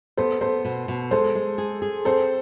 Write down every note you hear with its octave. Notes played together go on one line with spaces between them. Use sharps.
B3 A4 C5
B3 A4 C5
B2
B2
G#3 A4 C5
G#3
G#4
G#4
C4 A4 C5